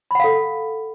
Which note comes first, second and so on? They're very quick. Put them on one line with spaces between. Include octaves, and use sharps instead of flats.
B5 F#5 F5 A4